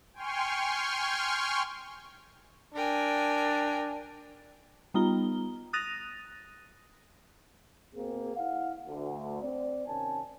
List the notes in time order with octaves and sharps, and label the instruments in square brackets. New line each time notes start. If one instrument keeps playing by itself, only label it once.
[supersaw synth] G5 G#5 C6 C#6 F6
[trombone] D4 [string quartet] A#4 G5 G#5
[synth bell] G3 B3 D#4 F4 A#5 G7
D#6 F#6 A6 A#6 D#7 F7
[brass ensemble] B2 A#3 C4 G#4
E4 F5 F#5
D2
C4 D5
C3 D#3 C#4 G#5 A5